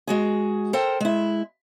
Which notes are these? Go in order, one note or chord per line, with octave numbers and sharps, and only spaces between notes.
G#3 F#4 G#4
A4 A#4 C5 G5
G#3 E4